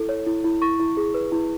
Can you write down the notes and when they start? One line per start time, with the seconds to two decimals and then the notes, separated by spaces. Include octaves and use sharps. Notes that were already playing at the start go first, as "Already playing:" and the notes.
Already playing: E4 A4
0.09 C#5
0.26 E4
0.44 E4
0.62 E4 C#6
0.80 E4
0.97 G#4
1.14 B4
1.32 E4